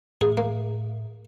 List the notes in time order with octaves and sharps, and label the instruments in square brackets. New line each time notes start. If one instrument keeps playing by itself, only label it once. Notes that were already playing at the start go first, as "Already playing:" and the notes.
[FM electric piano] A2 [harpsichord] G#4
[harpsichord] A#3